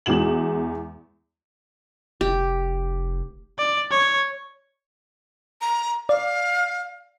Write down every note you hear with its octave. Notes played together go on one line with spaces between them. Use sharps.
E2 G#3 F#4 E7 F#7
F1 G4
D5
C#5
A#5
D5 F5